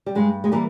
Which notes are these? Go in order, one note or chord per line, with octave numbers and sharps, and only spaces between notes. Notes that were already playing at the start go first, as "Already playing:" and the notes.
G3
G2 G#3
G#3
E3 G3 A#3